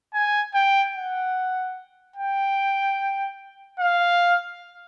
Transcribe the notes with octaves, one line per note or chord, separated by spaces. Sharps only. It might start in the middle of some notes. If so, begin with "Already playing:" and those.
G#5
G5
F#5
G5
F5